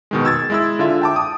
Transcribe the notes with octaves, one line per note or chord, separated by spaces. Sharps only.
B2 D#3 G#3
E6 G#6 A6
G#3 E4 E6
D3 F4 E5
G5 A5 D6
D#6